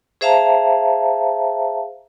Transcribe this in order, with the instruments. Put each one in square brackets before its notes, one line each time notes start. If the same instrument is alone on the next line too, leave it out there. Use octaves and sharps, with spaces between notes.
[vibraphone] G#4 C5 E5 F5 A5 A#5